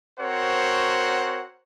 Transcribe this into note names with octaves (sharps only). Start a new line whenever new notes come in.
C4 F#4 A#4 C5 C#5 F#5